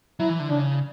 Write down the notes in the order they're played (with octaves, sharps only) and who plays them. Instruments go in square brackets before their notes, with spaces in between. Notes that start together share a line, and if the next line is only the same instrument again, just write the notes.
[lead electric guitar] F#3 [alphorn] E4
[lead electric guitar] E3
D3
[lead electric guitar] C#3 [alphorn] D4